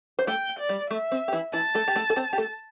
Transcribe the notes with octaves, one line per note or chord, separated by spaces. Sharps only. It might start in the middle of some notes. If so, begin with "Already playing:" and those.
C5
A3 A4 G5
D5
G3
A3 E5
C4
G4
E3 E4
E3 E4 A5
A3 A4
G4
A3 A4
A4
C4 C5
G4
A3 A4